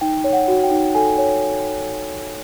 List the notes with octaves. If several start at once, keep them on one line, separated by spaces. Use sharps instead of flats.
D#4 G5
C#5
F#5
F#4
G5
D#4
A4 G#5
C#5